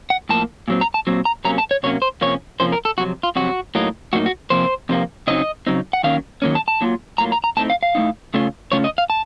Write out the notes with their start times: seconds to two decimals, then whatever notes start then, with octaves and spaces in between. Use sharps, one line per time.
0.10 F#5
0.29 A2 F3 A#3 A5
0.68 A#2 F#3 C4
0.81 A#5
0.94 A5
1.07 A#2 F#3 C4
1.25 A#5
1.45 C3 F#3 A#3 C#4 A#5
1.58 A5
1.71 C#5
1.83 C3 F#3 A#3 C#4 C#5
2.02 C5
2.21 C3 F3 A#3 C#4 C#5
2.60 C3 F3 A#3 C#4 C5
2.72 A#4
2.85 A4
2.98 F2 C3 F#3 F#4
3.23 F4
3.36 F2 C3 F#3 F#4
3.75 A2 F#3 A#3 D#4
4.13 A2 F#3 A#3 D#4 F#4
4.26 F#4
4.50 F2 C3 F3 A#3 C5
4.89 F2 C3 F3 A#3
5.27 C#3 F#3 C4 D#4 D#5
5.67 C#3 F#3 C4 D#4
5.93 F#5
6.03 D#3 F#3 A#3 C#4 F5
6.42 D#3 F#3 A#3 C#4
6.55 A5
6.68 A5
6.81 A2 F#3 A#3 F4
7.18 A2 F#3 A#3 F4 A#5
7.32 A#5
7.44 A#5
7.57 A2 A3 C4 D#4 A5
7.70 F5
7.83 F5
7.95 A2 A3 C4 D#4
8.34 C#3 A3 C#4 F4
8.72 C#3 A3 C#4 F4 C#5
8.84 D#5
8.98 F5
9.10 A5